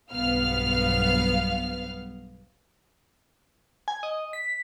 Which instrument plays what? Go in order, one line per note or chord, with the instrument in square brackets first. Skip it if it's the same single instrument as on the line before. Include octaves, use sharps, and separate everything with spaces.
[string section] B1 G2 B3 F5 F6
[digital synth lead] G#5
D#5
B6